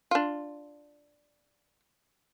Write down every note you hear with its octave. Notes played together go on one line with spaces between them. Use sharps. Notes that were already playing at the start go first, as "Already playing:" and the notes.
D4 F4